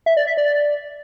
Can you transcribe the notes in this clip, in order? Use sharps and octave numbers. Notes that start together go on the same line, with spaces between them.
E5
D5
E5
D5